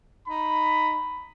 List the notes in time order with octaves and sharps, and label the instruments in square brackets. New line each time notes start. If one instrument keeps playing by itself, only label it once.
[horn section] D#4 B5